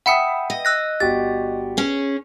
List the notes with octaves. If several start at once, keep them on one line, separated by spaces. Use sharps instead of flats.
E5 F#5 G5 B5 D#6 C#7
D#5
E6 F#6 A#6
G1 F#4 G4 A6
C#4 G#4